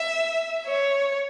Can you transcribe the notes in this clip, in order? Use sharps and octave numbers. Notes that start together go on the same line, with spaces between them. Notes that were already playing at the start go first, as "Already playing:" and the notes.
Already playing: E5
C#5